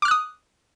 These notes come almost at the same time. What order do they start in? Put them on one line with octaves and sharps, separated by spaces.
D6 F6 F#6 D#6